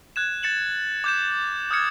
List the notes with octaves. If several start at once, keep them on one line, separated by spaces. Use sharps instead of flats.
F#6 G#6 E7
A6 C#7 E7 F#7
D6 G6 E7
D#6 F6 G6 G#6 C#7